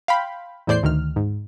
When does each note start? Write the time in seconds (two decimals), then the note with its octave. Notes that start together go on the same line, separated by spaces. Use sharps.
0.08 F5 G5 B5 C6
0.67 E2 A2 C5 D5 G6 C7
0.83 D2 D#3 F6
1.16 G#2